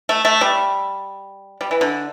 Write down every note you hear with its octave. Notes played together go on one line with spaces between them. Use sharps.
A3
A3
G3
G3
E3
D3